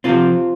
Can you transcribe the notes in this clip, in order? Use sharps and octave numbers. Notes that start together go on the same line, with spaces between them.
C3 F3 C4 F4